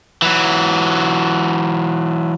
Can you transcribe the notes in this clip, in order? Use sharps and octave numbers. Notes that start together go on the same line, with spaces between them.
E3 F#3